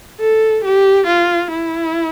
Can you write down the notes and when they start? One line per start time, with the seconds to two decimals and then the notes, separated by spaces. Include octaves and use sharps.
0.20 A4
0.64 G4
1.07 F4
1.51 E4